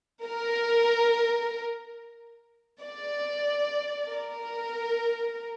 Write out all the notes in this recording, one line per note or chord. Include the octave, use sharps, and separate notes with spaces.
A#4
D5
A#4